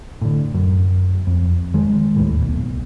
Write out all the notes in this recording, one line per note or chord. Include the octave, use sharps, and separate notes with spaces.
A2 D3
F#2
F2
D#3 G#3
D#2 A2
D#1 B1